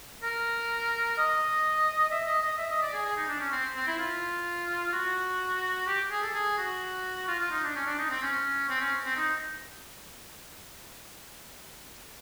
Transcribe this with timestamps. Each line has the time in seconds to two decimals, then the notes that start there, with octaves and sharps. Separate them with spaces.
0.23 A#4
1.18 D#5
2.11 E5
2.27 D#5
2.43 D#5
2.58 E5
2.70 D#5
2.82 D5
2.94 G#4
3.05 G#4
3.17 D#4
3.29 D4
3.40 C#4
3.52 C4
3.76 C4
3.87 E4
3.99 F4
4.93 F#4
5.87 G4
6.11 G#4
6.23 A4
6.34 G#4
6.58 F#4
7.28 F4
7.40 F4
7.52 D#4
7.64 D4
7.76 C#4
7.87 D4
7.99 D#4
8.10 C4
8.22 C#4
8.69 C4
8.81 C#4
9.05 C4
9.16 D#4